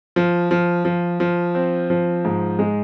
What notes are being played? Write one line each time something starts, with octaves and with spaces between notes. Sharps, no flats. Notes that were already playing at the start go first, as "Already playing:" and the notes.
F3
F3
F3
F3
C4
F3
G#2
G#3